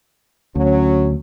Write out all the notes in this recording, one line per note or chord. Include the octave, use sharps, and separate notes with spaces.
D2 F#3 C#4